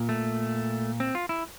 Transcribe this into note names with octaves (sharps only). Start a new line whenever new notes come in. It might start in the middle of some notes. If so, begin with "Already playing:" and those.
Already playing: A#2
A3
C4
F4
E4